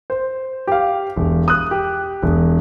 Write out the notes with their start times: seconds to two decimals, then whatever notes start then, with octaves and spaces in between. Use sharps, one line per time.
0.10 C5
0.67 G4 F5
1.16 E1
1.48 D#6 F#6
1.71 G4
2.23 E1